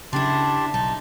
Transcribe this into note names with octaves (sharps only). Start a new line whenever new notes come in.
C#3 D4 E4 G4 A5 C6
B1 D#4 A5